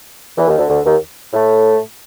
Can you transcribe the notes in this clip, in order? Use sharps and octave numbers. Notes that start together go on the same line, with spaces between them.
E2 E3
D#2 D#3
D2 D3
D2 D3
D#2 D#3
A2 A3